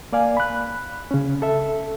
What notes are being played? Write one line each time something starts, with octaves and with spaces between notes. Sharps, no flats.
A#3 D5 F5 G#5
B5 F#6
C#3 C#4
A4 E5